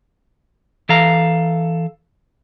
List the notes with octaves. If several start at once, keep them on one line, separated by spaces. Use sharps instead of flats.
E3 A4 F5 A#5